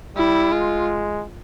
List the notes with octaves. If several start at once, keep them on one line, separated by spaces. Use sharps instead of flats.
G3 E4
G#3 F4